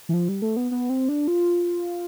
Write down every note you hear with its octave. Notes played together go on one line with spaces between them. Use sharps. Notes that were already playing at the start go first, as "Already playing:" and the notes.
E3
F3
G3
A3
B3
B3
C4
D4
F4